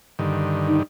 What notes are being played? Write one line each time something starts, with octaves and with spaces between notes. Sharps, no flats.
G2 D3 D#3
D#4